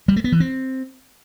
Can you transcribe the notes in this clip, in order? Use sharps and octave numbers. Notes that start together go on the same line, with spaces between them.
G3
A3
B3
E3
C4